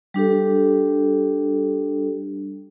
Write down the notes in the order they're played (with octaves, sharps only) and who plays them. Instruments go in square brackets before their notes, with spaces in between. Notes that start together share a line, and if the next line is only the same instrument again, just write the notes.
[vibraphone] G3 D4 G4 A4